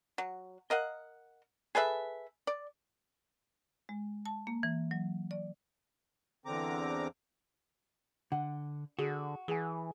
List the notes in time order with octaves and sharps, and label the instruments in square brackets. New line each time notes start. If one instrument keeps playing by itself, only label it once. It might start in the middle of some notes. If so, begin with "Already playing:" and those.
[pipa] F#3
A#4 D#5 F5 F#5
G#4 A4 B4 E5
D5
[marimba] G#3
A5
A#3
E3
F#3
D5
[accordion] E2 D3 C4 A#5 D6
[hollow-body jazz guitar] D3 [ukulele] F#5
[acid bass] D3 [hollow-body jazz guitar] F#4 [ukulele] G#4
[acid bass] E3 [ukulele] G#4 G#5